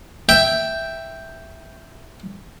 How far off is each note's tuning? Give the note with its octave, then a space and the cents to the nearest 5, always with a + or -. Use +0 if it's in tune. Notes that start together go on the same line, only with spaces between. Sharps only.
E5 +0 G5 +0